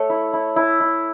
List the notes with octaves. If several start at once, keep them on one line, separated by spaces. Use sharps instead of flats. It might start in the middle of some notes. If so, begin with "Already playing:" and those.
Already playing: A3 C#5
E4
E4
E4
E4